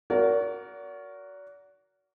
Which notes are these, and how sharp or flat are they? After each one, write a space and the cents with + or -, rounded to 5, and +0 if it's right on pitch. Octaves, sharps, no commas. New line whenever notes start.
F#4 +0 A#4 +0 D5 -40